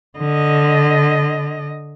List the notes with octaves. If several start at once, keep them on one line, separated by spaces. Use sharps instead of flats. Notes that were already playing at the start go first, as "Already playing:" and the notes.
D3 D#5